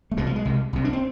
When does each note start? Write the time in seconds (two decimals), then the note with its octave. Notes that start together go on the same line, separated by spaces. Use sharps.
0.11 A3
0.17 C2 B2 G#3
0.26 F3
0.36 G#3
0.45 C2 C3
0.73 C2 C3
0.85 D4
0.93 C4